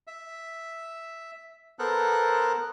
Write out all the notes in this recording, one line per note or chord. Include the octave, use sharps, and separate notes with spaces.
E5
B3 A4 A#4 C5 F#6